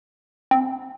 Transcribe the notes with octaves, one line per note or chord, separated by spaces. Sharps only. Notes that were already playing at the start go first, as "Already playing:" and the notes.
C4